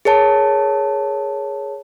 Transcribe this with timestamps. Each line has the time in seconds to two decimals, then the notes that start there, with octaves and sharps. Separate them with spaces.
0.05 G#4 A#4 C#5 A5